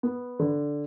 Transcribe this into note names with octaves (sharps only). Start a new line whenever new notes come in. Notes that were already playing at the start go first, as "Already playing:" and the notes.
B3
D3